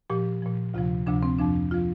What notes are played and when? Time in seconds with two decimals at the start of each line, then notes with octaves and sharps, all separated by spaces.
0.10 A#2 F3 G4
0.42 A#2 F3
0.74 D2 C3 F3 F4
1.06 D2 C3 F3 D4
1.23 C4
1.39 F2 F3 D4
1.71 F3 F4